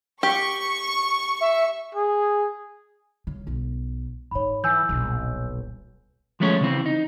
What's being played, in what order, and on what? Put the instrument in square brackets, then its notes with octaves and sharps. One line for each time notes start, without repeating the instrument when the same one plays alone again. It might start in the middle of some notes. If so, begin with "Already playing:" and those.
[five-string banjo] G4 [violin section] C#6
[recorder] E5
[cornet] G#4
[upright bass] C#3
B1
[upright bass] G#2 D#4 [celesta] C#5 B5
[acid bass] E3 [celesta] G#5 E6 G6
[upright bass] D#1 D4 [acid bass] B1
[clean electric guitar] F3 G#3 A3 C#4 B4 C#5
C#3 E3 C4
D#4